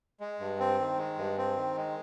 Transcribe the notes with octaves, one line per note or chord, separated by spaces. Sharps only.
G#3
G2
C4
D#3
G#3
G2
C4
D#3
G#3